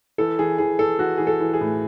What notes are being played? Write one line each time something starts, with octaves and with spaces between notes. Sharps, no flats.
E3 A4
E3 G#4
E3 G#4
E3 A4
E3 F#4
E3 G#4
A4
E3
G#4
A2